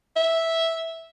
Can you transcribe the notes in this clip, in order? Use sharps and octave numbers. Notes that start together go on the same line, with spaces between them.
E5